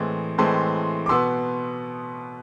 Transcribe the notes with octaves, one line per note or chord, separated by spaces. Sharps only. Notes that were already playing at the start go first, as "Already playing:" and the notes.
Already playing: A2 E3 G#3 C4
A2 E3 G#3 C4 A5 C6
D6
B2 B3 C6 E6